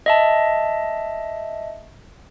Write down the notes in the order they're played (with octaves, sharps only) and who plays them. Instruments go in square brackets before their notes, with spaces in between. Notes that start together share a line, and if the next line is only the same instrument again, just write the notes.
[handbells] D#5 E5 A5